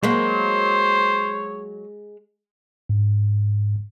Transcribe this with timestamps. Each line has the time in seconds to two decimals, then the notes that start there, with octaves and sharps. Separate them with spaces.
0.03 F#3 G#3 A#3 C5 C#5
2.90 G#2